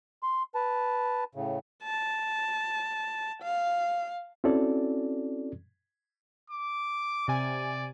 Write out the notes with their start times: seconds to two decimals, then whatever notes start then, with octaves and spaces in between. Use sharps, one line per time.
0.23 C6
0.55 B4 A5
1.35 A2 C#3
1.83 A5
3.43 F5
4.44 C4 C#4 E4 F#4 A4 D5
6.50 D6
7.28 C3 D5 G#5